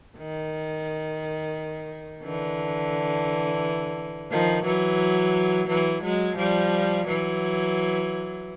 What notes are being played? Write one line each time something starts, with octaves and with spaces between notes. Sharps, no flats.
D#3
D3 E3
D#3 F3
E3 F#3
E3 F#3
F#3 G#3
F3 G3
E3 F#3